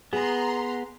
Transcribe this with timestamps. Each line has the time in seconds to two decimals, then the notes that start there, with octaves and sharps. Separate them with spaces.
0.13 B3 G#4 A#5 C6